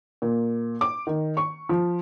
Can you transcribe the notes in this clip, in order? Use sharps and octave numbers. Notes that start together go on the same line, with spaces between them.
A#2
D6
D#3
C#6
F3